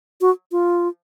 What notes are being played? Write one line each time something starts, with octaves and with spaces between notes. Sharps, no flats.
F#4
F4